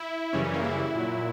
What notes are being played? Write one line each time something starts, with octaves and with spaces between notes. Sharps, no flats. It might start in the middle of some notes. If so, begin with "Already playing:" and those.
Already playing: E4
F#2 C#3 E3 G3 C#4
C#4
A#3
E4
A#2 F#3